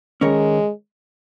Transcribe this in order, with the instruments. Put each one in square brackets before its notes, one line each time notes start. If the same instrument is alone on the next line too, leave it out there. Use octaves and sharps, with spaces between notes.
[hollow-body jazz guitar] D#3 C#4 A#4 C#5 [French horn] G#3